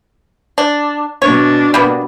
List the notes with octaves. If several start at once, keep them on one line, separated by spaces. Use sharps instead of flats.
D4
B2 D4 C#5
G3 A#3 B3